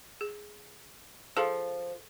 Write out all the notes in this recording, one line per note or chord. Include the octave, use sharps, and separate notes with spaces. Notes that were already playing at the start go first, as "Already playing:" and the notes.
G#4
F3 G#4 A4 F5